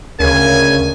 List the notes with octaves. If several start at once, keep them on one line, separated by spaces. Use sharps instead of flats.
D2 C#3 A#4 G#5